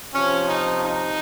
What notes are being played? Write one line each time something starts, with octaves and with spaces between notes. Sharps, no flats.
C3 F3 C#4
D#4
D#4